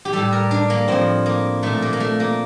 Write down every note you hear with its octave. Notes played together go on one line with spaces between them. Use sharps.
G4
A2 G3 A4
A#4
D4
A#3
A2 F3 C4
A#3
A#2 F3 A3
A#3
A#3
A3
A#3